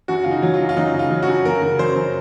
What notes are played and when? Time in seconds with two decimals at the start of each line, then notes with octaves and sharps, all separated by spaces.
0.08 F#2 F#4
0.24 C#3 F4
0.31 D#4
0.42 F#3
0.54 F4
0.60 F#2
0.69 F4
0.77 F#2 D#4
0.94 C#3
0.99 F4
1.10 F#3
1.23 F#4
1.28 F#2
1.45 F#2 A#4
1.62 C#3
1.78 F#3 C5
1.95 F#2